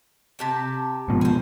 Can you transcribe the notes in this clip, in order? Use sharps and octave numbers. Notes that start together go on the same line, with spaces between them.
C3 G4 A5
G#2 B2 F3
G#4 C5